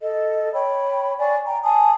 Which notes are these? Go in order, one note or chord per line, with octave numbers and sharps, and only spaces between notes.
A4 D#5
C#5 G5 B5
D5 G#5 C#6
G5 A#5
G#5 A5 D#6